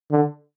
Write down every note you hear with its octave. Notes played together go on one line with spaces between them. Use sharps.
D3